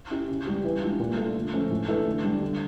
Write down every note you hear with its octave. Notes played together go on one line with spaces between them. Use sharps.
C#4 E4 G4
C#3
G3 C#4 G4
E3
G3 D4 F4
A#2
A3 D4 F4
D3
F3 A3 C#4
A2
E3 A3 D4
D3
G3 D4
D3